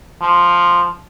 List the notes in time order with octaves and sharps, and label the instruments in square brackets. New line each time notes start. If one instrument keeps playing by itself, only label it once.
[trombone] F3